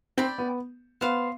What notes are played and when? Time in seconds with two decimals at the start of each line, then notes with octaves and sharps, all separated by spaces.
0.17 C4 D5 G5 B5
0.38 B3
1.01 B3 C5 F5 C6